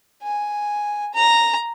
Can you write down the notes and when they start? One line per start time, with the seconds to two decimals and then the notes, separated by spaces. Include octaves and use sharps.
0.23 G#5
1.14 A#5